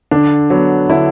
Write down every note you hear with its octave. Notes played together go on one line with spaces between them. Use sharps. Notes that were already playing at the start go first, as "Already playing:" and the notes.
D3 D4
F#3 B3
D3 E4